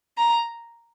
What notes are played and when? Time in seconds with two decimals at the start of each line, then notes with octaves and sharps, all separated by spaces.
0.17 A#5